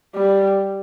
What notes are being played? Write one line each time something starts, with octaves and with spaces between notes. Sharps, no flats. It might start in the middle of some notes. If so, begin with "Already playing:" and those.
G3